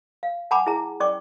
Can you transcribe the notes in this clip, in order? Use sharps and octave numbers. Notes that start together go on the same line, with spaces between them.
F5
F#5 G#5 A5 B5 D6
E4 G#4 E5 A5 A#5
C#4 D5 G5 C#6 D6